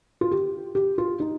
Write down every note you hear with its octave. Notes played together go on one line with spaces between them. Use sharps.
F4
G4
G4
F4
D#4